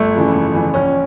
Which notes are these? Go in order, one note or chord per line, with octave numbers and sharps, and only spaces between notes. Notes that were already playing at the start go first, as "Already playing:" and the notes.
Already playing: G1 A3
F2 C#3 E3
G1
F2 C#3 E3
A#1 C#4